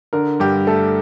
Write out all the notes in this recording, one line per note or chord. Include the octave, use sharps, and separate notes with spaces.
D3 A#4
G2 G4
A3 A4